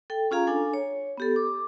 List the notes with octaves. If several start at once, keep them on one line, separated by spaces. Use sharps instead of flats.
A4 G5
C#4 F4 G#4 F5 A#5
D4 A4 G#5
C#5
B3 G4 A4
D6